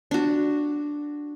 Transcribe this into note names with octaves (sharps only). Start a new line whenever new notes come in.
D4 F#4